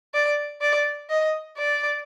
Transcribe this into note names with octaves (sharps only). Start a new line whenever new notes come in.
D5
D5
D#5
D5